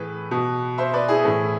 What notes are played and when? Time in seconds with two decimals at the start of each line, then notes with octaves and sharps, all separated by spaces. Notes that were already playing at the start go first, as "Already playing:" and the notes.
Already playing: A2 E3 G#4 B4
0.31 B2
0.78 C5 E5
0.93 B4 D5
1.08 E4 G#4
1.25 A2 E3